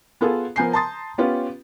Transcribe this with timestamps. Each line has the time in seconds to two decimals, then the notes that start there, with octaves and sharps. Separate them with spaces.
0.21 B3 F4 G#4 A4
0.56 F3 B3 A#4 G#5 G6 C7
0.73 A5 A#5 C6 D#6 A6
1.18 B3 C#4 F4 G4 B4